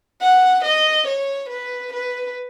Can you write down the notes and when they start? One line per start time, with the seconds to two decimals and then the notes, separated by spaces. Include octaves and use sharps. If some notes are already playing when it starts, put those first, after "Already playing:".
0.21 F#5
0.65 D#5
1.07 C#5
1.50 B4
1.93 B4